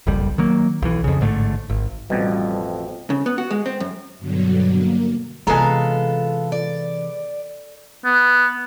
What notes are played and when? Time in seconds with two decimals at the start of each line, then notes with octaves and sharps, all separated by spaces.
0.07 F#1 B1 F2 G3
0.38 D#3 F#3 A#3
0.82 B1 E3
1.04 F2 C#3
1.21 A1 G#2 D3 A3
1.69 G#1
2.10 A1 F2 B2 G3
3.10 C#3
3.26 B3
3.38 F#4
3.51 G#3
3.66 C4
3.80 F#2
4.19 G2 B2 D3 F#3
4.77 A#3
5.47 C3 E3 G#3 B3 F4 A4 F5 A#5
6.52 D5
8.05 B3